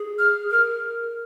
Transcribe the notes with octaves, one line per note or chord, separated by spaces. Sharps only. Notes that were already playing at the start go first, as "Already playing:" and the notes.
Already playing: G#4
F6
A#4 F6